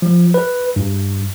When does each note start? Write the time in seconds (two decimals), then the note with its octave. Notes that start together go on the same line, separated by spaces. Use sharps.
0.02 F3
0.34 B4
0.76 G2